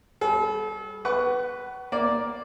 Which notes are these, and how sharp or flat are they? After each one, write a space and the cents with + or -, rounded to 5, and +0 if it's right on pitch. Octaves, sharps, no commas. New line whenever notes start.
G3 +0 A4 -40
B4 +0 F#5 +30 C#6 +15
A#3 +5 D5 +0